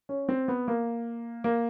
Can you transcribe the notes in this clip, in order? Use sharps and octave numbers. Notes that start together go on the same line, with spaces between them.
C#4
C4
B3
A#3
A#3